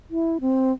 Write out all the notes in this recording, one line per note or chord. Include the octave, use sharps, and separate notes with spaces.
E4
C4